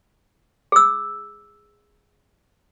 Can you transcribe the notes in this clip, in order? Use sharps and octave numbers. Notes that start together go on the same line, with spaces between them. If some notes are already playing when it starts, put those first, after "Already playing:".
G#4 E6